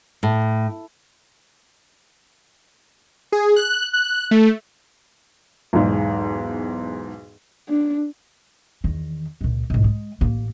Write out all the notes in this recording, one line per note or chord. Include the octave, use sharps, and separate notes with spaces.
A2
G#4
F#6
F#6
A3
B1 E2 G#2
D4
E2 D#3
C#2 A#2
B1 G#2
G#3
A1 A#3